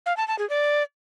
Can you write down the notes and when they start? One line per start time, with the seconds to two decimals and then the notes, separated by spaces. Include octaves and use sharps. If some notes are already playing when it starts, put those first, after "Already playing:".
0.06 F5
0.17 A5
0.28 A5
0.39 G#4
0.50 D5